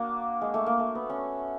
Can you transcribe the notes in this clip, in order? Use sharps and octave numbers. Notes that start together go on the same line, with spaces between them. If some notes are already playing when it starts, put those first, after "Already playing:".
Already playing: A#3 D4 F#4
G#3
A3
A#3
A3
B3
C#4